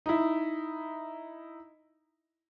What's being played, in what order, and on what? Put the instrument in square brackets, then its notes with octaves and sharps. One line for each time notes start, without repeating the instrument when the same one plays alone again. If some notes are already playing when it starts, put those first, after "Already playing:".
[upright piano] D#4 E4